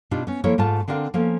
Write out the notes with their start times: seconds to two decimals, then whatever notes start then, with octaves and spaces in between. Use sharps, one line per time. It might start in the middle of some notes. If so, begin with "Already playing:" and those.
0.11 B2 D4 D#4 F4 G4
0.27 B3 C#4
0.44 F3 A#3 E4 A4 A#4 C#5
0.58 G#2 A3 F4 A5
0.88 D3 C4 D4 A#4 F5
1.14 F3 A#3 B3 C#4 A4